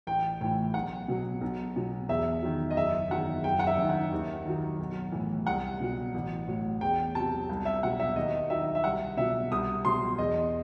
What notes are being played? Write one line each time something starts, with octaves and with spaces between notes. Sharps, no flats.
A1 G5
A2 E3 G5
B1 F#5
B2 F#3
B1
B2 F#3
E2 E5
D#3 F#3
D#5
F#1 E5
E2 D#3 F#3 F#5
F#1 G5
F#5
E5
F#2 D#3
F#5
D#2
D#3 F#3
B1
A2 E3
C2 F#5
B2 F#3
A1
A2 F#3
E2 G5
C3 F#3 A5
C2
E5
B2 F#3 F#5
E5
D#2 D#5
D#3 F#3 E5
E5
C2 F#5
B2 F#3 E5
C2 D#6
B2 F#3 C6
E2 D#5